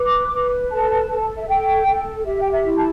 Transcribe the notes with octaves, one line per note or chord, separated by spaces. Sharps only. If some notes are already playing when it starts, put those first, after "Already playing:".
Already playing: B4 D6
B4
A4 A5
A4
E5
A4 G5
A4
G4 E5
G5
E5
E4
A5